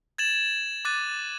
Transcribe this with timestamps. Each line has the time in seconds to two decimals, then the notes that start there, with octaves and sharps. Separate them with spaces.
0.18 G#6 A6 E7 F#7
0.85 D6 F#6 A6 D#7